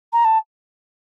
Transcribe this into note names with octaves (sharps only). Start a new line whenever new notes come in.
A#5
A5